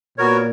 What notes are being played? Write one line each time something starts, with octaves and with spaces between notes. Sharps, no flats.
A#2 B3 F#4 A#4 C#5